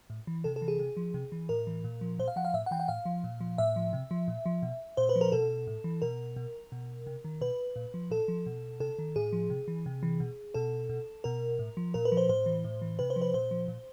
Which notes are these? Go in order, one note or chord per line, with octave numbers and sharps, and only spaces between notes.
A2
E3
C3 A4
A4
E3
G#4
C3
F3
C3
E3
A2 A#4
E3
A#2
F3
A#2 C5
F5
F3 F#5
F5
A2 E5
F#5
E3 G5
F#5
A2 F5
F3
A#2
F3
A2 E5
F3
C3
F3
A#2
F3
B2
A#2 C5
B4
F3
A#4
B2 A4
A2
E3
B2 A#4
B2
B2
C3
D#3
B2 B4
A#2
F3
A#2 A4
F3
B2
C3 A4
D#3
A2 G#4
F3
C3
E3
C3
E3
B2
B2 A4
B2
B2 A#4
A2
F3
A#2 A#4
B4
F3
C5
A2 C5
E3
A2
E3
C3 B4
C5
F3
B4
A#2 C5
F3
A#2